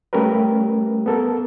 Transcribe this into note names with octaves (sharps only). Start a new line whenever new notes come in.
G3 A3 C#4 G4 A#4 B4
B3 A4 A#4